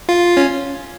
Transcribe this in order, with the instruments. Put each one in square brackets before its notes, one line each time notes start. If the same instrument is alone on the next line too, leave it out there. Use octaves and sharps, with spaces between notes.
[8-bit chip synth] F4
C#4